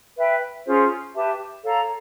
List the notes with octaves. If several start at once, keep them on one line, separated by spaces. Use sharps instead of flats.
B4 E5 G5
C#4 F4 G#4 C5
G4 B4 E5 A5
A4 C#5 F5 A#5